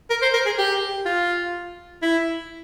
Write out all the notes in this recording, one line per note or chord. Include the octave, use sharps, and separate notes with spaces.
A#4
C5
A#4
G#4
G4
F4
E4